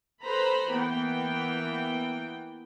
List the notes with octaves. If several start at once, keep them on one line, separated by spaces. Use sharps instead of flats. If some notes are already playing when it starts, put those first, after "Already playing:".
A4 B4 C5 A#5 B5
E3 A#3 B3 G5